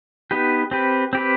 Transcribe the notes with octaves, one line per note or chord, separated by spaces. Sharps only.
B3 D#4 G4 B4
C4 G4 B4
C4 G4 B4